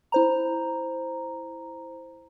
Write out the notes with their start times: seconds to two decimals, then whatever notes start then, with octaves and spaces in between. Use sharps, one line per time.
0.12 E4 C5 A#5